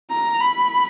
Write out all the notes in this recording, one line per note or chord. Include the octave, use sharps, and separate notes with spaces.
A#5
B5